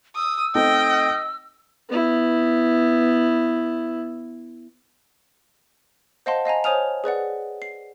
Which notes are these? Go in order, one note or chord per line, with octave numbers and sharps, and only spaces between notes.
D#6 E6
A3 C4 D#4 D#5 G5
B3 E4
C5 D#5 F5 F#5 A5 C6
D#5 F5 G#5 A#5
C5 C#5 G#5 D#6 F6 F7
G#4 B4 D5 F#5
C7